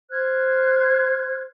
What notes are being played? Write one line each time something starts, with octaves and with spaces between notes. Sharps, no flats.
C5 F6 F#6 G#6